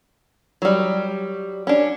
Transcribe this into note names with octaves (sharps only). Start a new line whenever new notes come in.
F#3 G3
C#4 D4